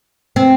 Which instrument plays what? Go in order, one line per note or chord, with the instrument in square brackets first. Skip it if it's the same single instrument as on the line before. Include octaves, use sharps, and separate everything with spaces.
[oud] C4